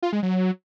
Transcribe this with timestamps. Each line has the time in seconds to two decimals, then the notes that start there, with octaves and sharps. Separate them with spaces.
0.03 F4
0.13 G#3
0.23 F#3